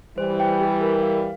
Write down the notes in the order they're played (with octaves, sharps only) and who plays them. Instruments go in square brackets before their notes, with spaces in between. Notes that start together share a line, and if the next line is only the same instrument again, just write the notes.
[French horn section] E3 G3 [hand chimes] C5
[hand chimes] G5
G4
A#4
F5